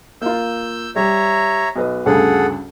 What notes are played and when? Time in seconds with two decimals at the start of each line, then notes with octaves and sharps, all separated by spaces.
0.21 A#3 F4 E6 G6
0.96 G3 C#5 E5 A#5
1.76 B1 B4 D#5
2.06 D2 G2 C#3 G#4 A4 F#5